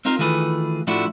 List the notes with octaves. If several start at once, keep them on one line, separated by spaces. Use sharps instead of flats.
C4 D#4 F4 A#4
D#3 E3 A3 F4 G#4 B4
A2 F3 A3 D4 E4 F#4